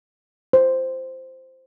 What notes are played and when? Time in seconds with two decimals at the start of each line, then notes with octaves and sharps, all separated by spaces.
0.53 C5